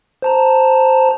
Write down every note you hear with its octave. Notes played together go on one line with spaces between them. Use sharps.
C5 A5 A#5